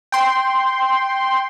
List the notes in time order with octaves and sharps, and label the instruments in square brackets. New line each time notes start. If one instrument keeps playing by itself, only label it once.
[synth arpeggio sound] G5 C6